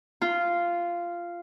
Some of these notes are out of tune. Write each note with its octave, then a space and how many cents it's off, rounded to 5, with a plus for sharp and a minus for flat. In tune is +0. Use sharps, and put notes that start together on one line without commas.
F4 -10